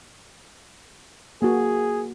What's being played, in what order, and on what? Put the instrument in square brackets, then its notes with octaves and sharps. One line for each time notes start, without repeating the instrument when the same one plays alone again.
[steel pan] A#3 F#4 [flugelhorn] G#4